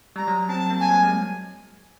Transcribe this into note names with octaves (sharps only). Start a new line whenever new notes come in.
G3 A#5
F#3
C4 A5
A#3
G#5
F#3
G#3